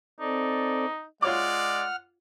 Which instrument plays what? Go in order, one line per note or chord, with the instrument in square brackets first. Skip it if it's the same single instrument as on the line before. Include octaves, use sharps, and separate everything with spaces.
[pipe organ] C4 A4 D5 [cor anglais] D#4
[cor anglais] G#3 [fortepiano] F4 C#5 D6 [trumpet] D5 [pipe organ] F#5 F6